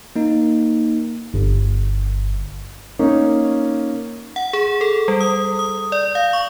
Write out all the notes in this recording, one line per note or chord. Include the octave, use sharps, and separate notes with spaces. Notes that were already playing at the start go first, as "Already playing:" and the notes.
A#3 D#4
G1
A#3 C#4 D#4
F#5
G#4
A4
G3
D#6
D#6
D5
F5
C#6